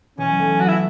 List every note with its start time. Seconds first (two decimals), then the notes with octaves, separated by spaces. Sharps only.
0.17 B2 E3 C#4
0.28 F#3
0.39 E3 A3
0.60 F#3 B3 F#4
0.68 E4